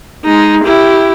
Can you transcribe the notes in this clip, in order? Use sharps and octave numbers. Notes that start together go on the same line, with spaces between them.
G#3 D#4
E4 G4